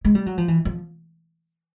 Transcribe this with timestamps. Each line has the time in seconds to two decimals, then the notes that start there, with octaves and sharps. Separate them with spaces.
0.05 G#3
0.15 G3
0.26 F#3
0.38 F3
0.48 E3
0.65 F3